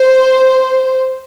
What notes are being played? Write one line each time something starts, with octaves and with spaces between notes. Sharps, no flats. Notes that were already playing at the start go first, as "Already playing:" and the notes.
Already playing: C5